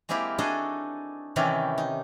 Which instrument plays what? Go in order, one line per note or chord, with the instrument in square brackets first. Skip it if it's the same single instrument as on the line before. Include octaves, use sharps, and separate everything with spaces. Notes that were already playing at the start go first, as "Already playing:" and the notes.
[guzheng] G#3 A#3 C4 E4 G4
D4 D#4 F#4 G#4 A4 D#5
C3 D#3 E3 C#4 E4 G4
D#4